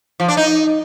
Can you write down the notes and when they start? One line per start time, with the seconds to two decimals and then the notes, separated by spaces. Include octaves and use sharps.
0.20 F3
0.28 D4
0.37 D#4